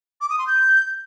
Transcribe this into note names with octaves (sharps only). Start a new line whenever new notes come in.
D6
D#6
C6
G6